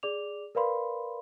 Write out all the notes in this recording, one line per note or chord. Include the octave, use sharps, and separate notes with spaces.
G#4 D5 D6 F7
A#4 B4 D5 F5 B5 C6